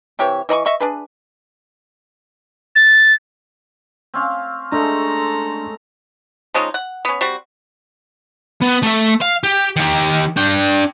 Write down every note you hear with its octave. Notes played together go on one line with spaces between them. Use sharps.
C3 E3 G4 C#5
E3 D#5 B5 C#6
D#5 E5 C#6
D4 G#4 B4
A6
C4 C#4 F5
G#3 A3 D4 A4 A#5
F3 G#3 C#4 D#4
F#5
B3 C#4
G3 C4 F#4
B3
A3 E5
F5
G4
D#3 G4
D4 G5